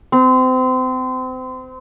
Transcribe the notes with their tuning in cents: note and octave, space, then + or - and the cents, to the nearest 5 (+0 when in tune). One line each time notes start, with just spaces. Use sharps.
C4 -30